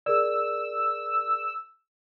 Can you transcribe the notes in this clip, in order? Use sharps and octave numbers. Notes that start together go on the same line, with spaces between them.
G#4 A#4 D5 E6